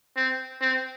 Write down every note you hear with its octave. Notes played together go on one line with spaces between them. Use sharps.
C4
C4